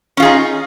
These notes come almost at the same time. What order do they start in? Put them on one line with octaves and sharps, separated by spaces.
C#4 F4 G#4 D#4